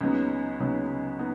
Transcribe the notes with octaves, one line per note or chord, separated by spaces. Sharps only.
C#2 C#3 F#3 B3 D#4
C#2 C#3 F#3 B3 D#4
B3 D#4